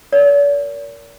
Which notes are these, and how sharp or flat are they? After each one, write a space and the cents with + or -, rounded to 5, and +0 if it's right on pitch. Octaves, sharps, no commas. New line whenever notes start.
A#4 +0 D5 -45